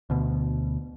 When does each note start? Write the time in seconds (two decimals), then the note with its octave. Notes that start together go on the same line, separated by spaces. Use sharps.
0.10 D2 B2